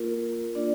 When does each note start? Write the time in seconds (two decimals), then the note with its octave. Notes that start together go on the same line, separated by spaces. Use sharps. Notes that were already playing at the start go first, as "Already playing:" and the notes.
Already playing: A#3 F4 A#4
0.55 A#3 D4 F4 D5